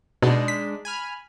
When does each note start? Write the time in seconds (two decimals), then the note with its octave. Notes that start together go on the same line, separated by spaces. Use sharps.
0.22 B2 G#3 D4 D#4
0.48 B6
0.85 G#5 B5 F6